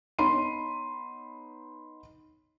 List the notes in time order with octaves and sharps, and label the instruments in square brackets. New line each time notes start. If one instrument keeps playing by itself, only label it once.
[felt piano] B3 D#4 C#5 B5 C6 D#7